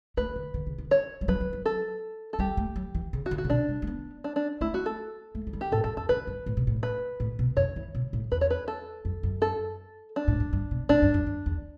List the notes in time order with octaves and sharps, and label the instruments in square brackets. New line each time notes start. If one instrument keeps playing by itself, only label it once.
[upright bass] A3 [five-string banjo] B4
[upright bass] D3
D3
C#3
D3
[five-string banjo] C#5
[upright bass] G3
[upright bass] F#3 [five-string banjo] B4
[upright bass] F#3
F#3
[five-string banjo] A4
A4
[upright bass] G3 [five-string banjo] G4
[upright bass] A3
F#3
E3
C#3
[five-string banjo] F#4
[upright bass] D3
[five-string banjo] F#4
[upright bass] C#3
[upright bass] B2 [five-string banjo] D4
[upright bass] G3
A3
B3
[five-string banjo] D4
D4
[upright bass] A3 [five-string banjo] E4
[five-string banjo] F#4
A4
[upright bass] A3
F#3
G3
[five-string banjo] G4
[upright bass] A2 [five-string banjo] A4
[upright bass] G2 [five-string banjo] A4
[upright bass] E2 [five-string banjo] A4
[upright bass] F#2 [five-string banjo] B4
[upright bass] G2
A2
B2
A2
[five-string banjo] B4
[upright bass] A2
B2
[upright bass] F#2 [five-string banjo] C#5
[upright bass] E3
B2
A2
[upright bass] E2 [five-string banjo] B4
[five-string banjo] C#5
B4
A4
[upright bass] F#2
F#2
[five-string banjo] A4
D4
[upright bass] A2
F#2
G2
B2
[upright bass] A2 [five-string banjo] D4
[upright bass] G2
F#2
F#2
E2